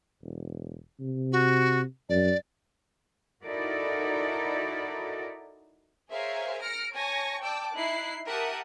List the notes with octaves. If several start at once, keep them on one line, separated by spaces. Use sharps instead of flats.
E1
C3
F#4
F#2 D5
D#4 E4 F#4 A4 A#4 D5
G#4 A#4 C5 C#5 E5 F5
F6 A#6 C#7 D7
C#5 G#5 A5 C#6 A#6
D5 G5 A5 D6 E6
D#4 E4 F#6 C7
G4 A#4 E5 F#5 A5 D#6